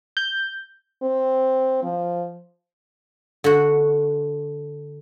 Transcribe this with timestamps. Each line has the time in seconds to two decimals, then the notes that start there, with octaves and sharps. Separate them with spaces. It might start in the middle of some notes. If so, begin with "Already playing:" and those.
0.17 G6
1.03 C4
1.83 F3
3.44 D3 F#4